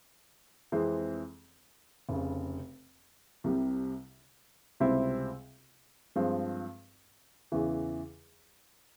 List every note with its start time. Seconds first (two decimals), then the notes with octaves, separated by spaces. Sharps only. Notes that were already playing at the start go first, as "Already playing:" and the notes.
0.72 F2 E3 G#3 C4
2.09 F1 F2 C#3
3.44 C2 C3 G3
4.80 C#2 C3 G3 C4 E4
6.16 G2 F3 G#3 C4
7.52 E2 C#3 E3